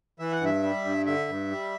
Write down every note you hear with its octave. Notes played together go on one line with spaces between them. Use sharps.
E3 E5
F#5
G2 E5
G3
G2
D3 E5
G2
G3